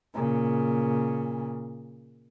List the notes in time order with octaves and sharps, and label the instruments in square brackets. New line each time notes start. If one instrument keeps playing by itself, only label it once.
[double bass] A#2 C#3